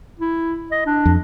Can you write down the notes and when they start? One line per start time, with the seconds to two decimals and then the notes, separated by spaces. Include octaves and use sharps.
0.20 E4
0.72 D#5
0.86 D4
1.06 F2